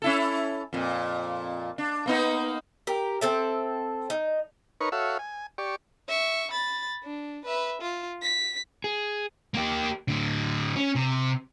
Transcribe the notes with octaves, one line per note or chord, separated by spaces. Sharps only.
C#4 E4 A4
F2 A#2
D4
A#3 B3 D#4
G4 A#4
C4 A4 E5
D#4
D#4 A#4 B4 C#5 C#6
F#4 A4 C#5 E5 F5
G#5
G4 D5 C#6
E5 C#6
B5 A6
D4
B4 E5
F4
B6
G#4
A#3 G4
A2 D3
C#4
C3